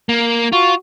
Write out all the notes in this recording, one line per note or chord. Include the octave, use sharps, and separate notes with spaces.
A#3
F4 F#4